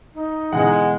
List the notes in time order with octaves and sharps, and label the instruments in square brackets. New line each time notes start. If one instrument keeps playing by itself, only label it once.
[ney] D#4
[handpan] B2 D3 E3 [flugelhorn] G#3 [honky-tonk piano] F#5